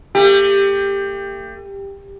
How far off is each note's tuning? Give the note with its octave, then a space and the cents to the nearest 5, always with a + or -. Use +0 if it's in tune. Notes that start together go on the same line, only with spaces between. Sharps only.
A3 +40 G4 +15